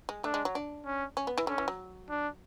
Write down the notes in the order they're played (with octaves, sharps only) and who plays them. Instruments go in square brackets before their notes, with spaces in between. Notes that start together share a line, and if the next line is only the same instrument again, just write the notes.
[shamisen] G#3
[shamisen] A3 [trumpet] D4
[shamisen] G#3
F#3
D4
[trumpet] C#4
[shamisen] C#4
B3
E3
[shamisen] D3 [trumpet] C#4
[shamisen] E3
F#3
[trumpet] D4